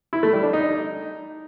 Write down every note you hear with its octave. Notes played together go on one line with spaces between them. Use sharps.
E4
A3
G3
D4
D#4